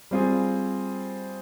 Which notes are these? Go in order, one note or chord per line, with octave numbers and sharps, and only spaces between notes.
G3 C4 F4 G#4